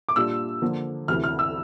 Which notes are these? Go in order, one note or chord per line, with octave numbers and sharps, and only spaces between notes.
D6
A#2 G3 D4 F4 E6
D3 F3 A#3
D2 C3 E3 F6
F6
E6